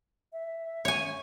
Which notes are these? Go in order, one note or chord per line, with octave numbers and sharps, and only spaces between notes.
E5
C#5 G#5